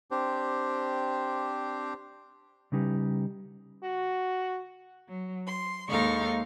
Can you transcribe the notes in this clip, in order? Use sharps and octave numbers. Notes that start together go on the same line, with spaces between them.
C4 D4 G4 C5
C#3 G3 C#4 D#4 G4 B4
F#4
F#3
C6
D#2 G#3 D#4 A4 F5 C#6